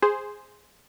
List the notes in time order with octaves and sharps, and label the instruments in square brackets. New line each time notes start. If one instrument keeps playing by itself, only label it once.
[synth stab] G#4 C5